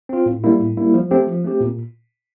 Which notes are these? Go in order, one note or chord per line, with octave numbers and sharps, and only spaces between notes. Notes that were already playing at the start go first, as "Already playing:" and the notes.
C4 F4
A2
G3 A#3 E4
A2
G3 A#3 E4
F3
A3 C4 G4
F3
A3 C4 G4
A#2